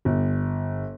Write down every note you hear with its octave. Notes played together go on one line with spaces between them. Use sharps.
G1